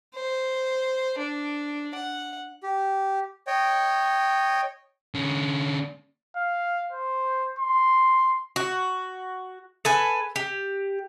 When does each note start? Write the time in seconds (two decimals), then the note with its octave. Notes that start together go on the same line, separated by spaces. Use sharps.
0.15 C5
1.18 D4
1.95 F#5
2.63 G4
3.47 C#5 D#5 G5
5.15 D3 C#4
6.37 F5
6.93 C5
7.59 C6
8.56 F#4
9.85 A4 B4 G#5
10.36 G4